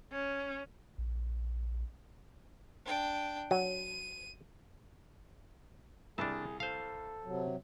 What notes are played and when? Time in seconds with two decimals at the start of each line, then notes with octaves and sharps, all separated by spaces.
0.11 C#4
0.98 A#1
2.85 D4 G5
3.51 F#3 D#7
6.18 C2 D4 G#4 A5
6.60 A4 C5 F5
7.25 C3 F#3